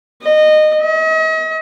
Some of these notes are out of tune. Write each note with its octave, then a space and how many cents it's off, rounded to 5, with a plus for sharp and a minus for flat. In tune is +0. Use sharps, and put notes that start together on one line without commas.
D#5 -20
D#5 +40